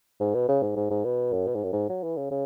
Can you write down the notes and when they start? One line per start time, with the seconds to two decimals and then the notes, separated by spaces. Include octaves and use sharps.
0.20 G#2
0.34 B2
0.48 C#3
0.62 G#2
0.76 G#2
0.90 G#2
1.04 B2
1.32 F#2
1.47 B2
1.55 G#2
1.63 F#2
1.72 G#2
1.89 F#3
2.03 E3
2.17 C#3
2.31 C#3